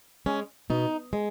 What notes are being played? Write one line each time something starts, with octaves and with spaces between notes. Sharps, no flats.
G#3 C#4
B2 D#4
G#3